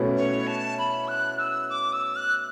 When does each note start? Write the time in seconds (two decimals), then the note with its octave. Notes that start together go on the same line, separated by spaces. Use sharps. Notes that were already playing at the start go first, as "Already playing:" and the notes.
Already playing: B2 A3 C#4 E4 B4
0.16 C#5
0.47 A5
0.78 B5
1.08 F#6
1.39 E6
1.70 D6
1.93 E6
2.16 F#6